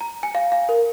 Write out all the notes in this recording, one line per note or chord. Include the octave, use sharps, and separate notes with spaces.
A#5
G#5
F5
F5
A#4